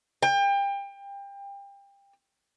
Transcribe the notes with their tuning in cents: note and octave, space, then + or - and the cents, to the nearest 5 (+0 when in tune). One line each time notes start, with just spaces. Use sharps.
G5 +30